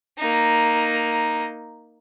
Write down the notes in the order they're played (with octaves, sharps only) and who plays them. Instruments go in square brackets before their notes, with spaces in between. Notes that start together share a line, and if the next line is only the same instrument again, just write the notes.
[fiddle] A#3 D#4